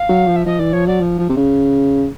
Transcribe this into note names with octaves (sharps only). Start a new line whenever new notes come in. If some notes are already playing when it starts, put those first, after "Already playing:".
Already playing: F5
F#3
F3
E5
F3 D#5
E3 D5
F3 C#5
F#3 D5
F3
F3
C3
C#3